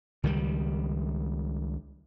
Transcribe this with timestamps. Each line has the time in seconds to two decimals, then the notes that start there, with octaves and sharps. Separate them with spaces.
0.23 C#2 D#3 F3 G3